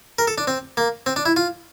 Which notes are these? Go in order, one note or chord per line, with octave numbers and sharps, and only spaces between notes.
A#4
A4
D4
C4
A#3
C4
D4
E4
F4